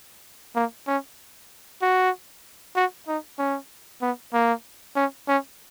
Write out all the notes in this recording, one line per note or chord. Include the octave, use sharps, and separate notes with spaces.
A#3
C#4
F#4
F#4
D#4
C#4
B3
A#3
C#4
C#4